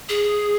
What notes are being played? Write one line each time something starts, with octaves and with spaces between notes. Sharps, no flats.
G#4